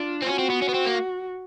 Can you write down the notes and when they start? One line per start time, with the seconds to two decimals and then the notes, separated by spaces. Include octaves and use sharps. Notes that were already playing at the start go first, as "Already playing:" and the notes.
Already playing: D4 F4
0.22 C4
0.27 C#4 F#4
0.39 C4
0.50 B3
0.62 C#4
0.69 B3
0.74 C4
0.86 A#3